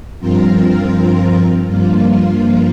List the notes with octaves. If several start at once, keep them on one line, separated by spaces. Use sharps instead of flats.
G2 F3 C4 F4 A#4
G2 F3 A#3 F4